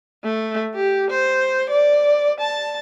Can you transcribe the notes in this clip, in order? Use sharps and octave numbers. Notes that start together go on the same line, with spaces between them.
A3
G4
C5
D5
A5